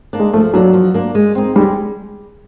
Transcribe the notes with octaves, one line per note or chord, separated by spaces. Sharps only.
A#3 D4
G#3
F3 A3
F#3 A#3 D4
F3
A#3 D4
G#3
C4 D#4
G3 G#3